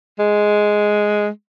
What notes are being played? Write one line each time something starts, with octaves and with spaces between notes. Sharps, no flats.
G#3